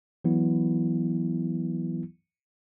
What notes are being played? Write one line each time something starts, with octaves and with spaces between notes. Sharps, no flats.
E3 F#3 B3 E4